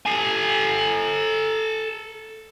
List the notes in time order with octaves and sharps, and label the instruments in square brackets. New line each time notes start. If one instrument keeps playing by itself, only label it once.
[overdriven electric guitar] A4 G#5